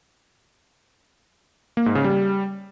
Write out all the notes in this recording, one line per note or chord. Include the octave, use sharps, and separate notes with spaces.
A#3
G#2
C#3
G3